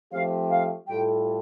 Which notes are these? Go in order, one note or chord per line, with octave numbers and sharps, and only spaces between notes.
F3 A3 C4 G4 C5 F5
F5
A2 G3 F4 A4 G5